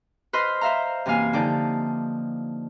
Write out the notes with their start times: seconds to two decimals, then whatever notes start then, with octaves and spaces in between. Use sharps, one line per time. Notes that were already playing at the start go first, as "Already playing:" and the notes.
0.33 B4 C5 D#5 C6 F6
0.61 C5 E5 F5 A#5
1.06 F#2 C3 E3 A#3 F5 G#5
1.33 D3 F3 D#4 D5 G5